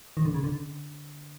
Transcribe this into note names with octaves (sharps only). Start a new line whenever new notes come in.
D#3
D3
C#3
D3